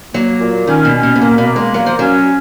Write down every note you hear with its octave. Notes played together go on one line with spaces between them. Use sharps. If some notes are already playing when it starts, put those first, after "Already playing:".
F#3 A#3
A#2
D#3 C#4
B2
C#4
B2
B2
A#2 A#3
B2
A#3
G#3
F#3 A#3
F3
F#3 C#4